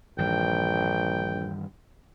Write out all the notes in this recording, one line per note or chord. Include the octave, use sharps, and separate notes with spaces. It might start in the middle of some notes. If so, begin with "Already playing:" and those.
A#1 G2 D#3 E3 G5